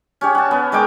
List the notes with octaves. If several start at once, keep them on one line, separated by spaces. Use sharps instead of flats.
C#4 G4 C#5
F#5 A5
B3 C#4
G#3 A#4 G5 D6